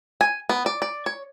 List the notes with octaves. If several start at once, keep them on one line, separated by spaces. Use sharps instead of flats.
G#5
B3
D5
D5
C#5